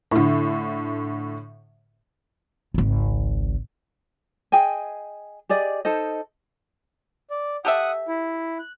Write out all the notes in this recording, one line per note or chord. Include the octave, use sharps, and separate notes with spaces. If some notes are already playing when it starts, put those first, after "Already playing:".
A2 D3
G#1 C#2
G#4 D#5 G5 G#5
G4 G#4 D5 D#5
D#4 A4 C5 D#5
D5
G4 A4 E5 F#5 D#6
E4
F#6